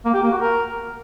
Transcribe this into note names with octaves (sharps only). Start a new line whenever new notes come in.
A#3
G4
A#3
F#4
A#4